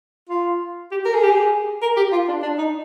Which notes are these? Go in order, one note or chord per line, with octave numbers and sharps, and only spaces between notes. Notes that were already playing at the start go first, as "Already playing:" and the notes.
F4
G4
A#4
G#4
G4
G#4
A#4
G4
F4
D4
D4
D#4